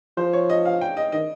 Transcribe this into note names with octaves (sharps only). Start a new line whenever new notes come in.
F3 C5
C#5
D#5
F5
G5
D#5
D#3 D#5